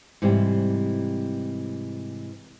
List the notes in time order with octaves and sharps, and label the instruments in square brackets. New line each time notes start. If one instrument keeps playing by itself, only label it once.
[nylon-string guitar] G#2 C3 E3 G3